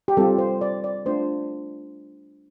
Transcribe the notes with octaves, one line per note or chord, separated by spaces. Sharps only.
G4
G3 C4 F4 A4
C5
D5
D5
A3 D4 F4 C5